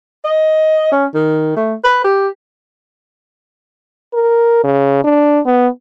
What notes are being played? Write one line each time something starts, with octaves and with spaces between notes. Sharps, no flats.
D#5
C#4
D#3
A3
B4
G4
A#4
C#3
D4
B3